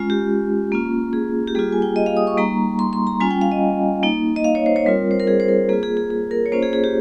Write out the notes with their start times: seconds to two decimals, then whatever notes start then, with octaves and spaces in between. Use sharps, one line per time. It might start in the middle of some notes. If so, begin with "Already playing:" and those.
Already playing: G#3 C#4 F4
0.10 G4
0.72 A#3 C#4 F4
1.13 G#4
1.47 G4
1.55 G3 A#3 F4 G#4
1.72 G#5
1.82 G5
1.96 D#5
2.06 F5
2.17 D#6
2.27 C#6
2.37 G3 A#3 D#4 A#5
2.79 C6
2.93 C6
3.07 A#5
3.20 G3 C#4 F4 G#5
3.31 G5
3.41 F5
3.52 D#5
4.03 A#3 D#4
4.36 D#5
4.44 F5
4.55 C#5
4.66 C5
4.76 C#5
4.86 G3 C4 F4 A#4
5.11 C5
5.20 A#4
5.27 G#4
5.40 C5
5.48 A#4
5.69 A#3 G#4
5.73 F4
5.83 G#4
5.97 G#4
6.10 G#4
6.31 A#4
6.46 C#5
6.52 A#3 C#4 F4 C5
6.63 G#4
6.73 G#4
6.84 G4